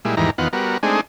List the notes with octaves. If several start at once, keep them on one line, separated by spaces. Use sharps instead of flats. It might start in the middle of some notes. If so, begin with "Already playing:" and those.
A#2 G3 G#3 E4
E2 G#2 D#3 E3 G3 A#5
E2 D#3 B3 F4 F#5
G3 B3 F#4 A#4
G#3 A3 C4 D4 D#4 G#4